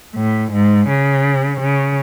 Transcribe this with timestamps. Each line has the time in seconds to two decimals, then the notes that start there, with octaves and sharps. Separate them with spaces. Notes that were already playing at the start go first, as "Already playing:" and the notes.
0.16 A2
0.52 G#2
0.88 C#3
1.61 C#3